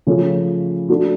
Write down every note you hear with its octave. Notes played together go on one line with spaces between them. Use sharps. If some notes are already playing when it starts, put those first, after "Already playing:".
C#3 F3 A3 C#4
A3 D4 F#4